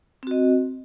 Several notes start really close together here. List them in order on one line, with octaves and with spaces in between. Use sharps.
C4 F#4 D#5